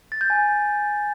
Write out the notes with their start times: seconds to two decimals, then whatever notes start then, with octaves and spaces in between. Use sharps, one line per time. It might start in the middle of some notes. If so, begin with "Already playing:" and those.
0.12 A6
0.21 G6
0.30 G#5